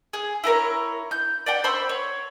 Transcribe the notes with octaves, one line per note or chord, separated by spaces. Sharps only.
G#4
E4 A4 A#4 C#5
G6
D5 F#5 G5
C5 B5 C#6 E6
C#5